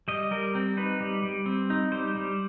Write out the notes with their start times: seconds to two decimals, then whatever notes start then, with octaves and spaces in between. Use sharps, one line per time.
0.08 G3 D#5
0.31 G3 A#4
0.55 C4
0.77 D#4 B4
1.00 G3
1.23 G3
1.46 C4
1.70 D#4
1.92 G3 C5
2.16 G3